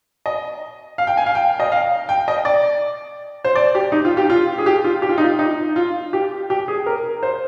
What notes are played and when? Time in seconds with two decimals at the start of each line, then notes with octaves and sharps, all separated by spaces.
0.26 D#5
0.98 F5
1.07 G5
1.17 G#5
1.26 F5
1.35 G5
1.60 D#5
1.72 F5
2.09 G5
2.28 D#5
2.45 D5
3.44 C5
3.55 D5
3.75 G4
3.92 D#4
4.05 F4
4.17 G4
4.30 F4
4.58 G#4
4.66 G4
4.84 F4
5.02 G4
5.09 F4
5.18 D#4
5.24 F4
5.39 D#4
5.76 F4
6.13 G4
6.50 G4
6.68 G#4
6.86 A#4
7.23 C5